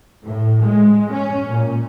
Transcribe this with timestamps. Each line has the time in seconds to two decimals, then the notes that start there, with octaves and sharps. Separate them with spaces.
0.25 A2
0.64 G#3
1.13 C#4
1.50 A#2